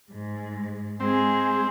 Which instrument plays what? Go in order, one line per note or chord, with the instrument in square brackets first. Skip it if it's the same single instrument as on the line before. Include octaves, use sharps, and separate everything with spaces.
[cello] G#2 G#3
[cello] G#3 G#4 [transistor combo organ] C4